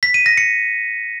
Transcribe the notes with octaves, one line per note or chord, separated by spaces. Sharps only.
B6
D#7
A#6
C#7